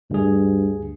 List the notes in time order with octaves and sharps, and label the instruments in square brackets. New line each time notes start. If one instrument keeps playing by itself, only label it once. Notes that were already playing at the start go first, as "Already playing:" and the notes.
[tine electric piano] D2 G#4 [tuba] G2